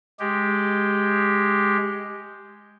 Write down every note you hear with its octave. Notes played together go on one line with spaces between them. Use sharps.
G#3 G4